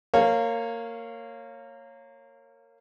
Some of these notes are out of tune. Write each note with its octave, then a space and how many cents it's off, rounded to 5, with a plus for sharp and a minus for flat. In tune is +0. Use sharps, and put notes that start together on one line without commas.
A#3 -20 C#5 -15 F5 +0